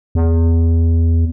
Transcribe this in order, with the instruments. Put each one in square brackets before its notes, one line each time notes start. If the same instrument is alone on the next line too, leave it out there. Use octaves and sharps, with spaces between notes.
[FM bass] E2